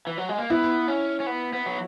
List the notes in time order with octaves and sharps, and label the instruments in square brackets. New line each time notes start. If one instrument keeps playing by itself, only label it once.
[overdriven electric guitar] E3
F#3
G#3
A#3
[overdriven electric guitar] B3 [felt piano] E4
[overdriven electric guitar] C#4
C#4
B3
B3
F#3